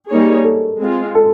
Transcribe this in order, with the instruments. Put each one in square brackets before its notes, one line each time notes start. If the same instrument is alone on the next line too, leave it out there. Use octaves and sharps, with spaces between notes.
[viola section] G3 A#3 D#4 G#4 C#5
[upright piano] A4
[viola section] G#3 C4 F4
[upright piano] A4